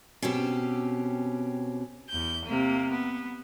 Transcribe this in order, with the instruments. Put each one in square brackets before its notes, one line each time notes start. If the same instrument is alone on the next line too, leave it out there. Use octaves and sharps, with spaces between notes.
[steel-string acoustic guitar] B2 C4 C#4 G4
[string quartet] E2 G6
C3 A#3
B3